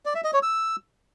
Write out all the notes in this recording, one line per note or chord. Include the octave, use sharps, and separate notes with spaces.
D5
E5
D#5
C#5
E6